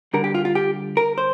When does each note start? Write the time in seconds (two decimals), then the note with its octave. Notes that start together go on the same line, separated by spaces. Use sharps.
0.14 D3 G3 A#4
0.24 G4
0.35 F4
0.45 F4
0.55 G4
0.97 A#4
1.18 C5